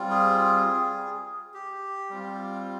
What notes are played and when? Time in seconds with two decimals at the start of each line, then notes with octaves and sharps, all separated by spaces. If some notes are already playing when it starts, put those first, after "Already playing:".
Already playing: G3 C4 F4
0.11 G#4
1.54 G4
2.10 G3 C4 F4